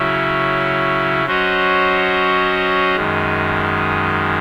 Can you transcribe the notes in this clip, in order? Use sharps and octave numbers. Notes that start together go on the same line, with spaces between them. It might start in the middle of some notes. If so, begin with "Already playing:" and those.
Already playing: C#3 F#3 C#4 E4
F#3 C#4 F#4 C5 D#5
F#2 D#3 G#3